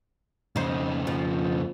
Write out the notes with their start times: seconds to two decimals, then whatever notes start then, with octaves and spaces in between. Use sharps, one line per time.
0.56 F2 C#3 D#4 C5
1.07 F3